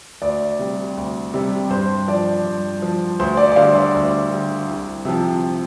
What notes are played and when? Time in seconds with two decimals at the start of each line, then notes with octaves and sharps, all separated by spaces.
0.22 D2 D5
0.59 C3 G3
0.97 D2
1.34 C3 G3
1.70 G2 C5
2.08 F3 D5
2.45 G2
2.82 F3
3.19 D2 C5
3.37 D5
3.52 D5
3.56 D3 G3 C5 F5
3.75 D5
3.94 D2
4.31 D3 G3
4.69 C2
5.05 C3 F3